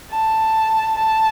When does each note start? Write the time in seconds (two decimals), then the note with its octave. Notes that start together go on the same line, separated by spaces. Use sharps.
0.11 A5
0.98 A5